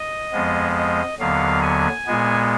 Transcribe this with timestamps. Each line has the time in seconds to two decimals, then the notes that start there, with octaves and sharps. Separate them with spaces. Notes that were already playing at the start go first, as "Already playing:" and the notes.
Already playing: D#5
0.33 F2 F3 G#3 B3
0.76 D#5
1.19 D#2 D3 F#3 B3 F5
1.62 G#5
2.06 A#2 G#3 B3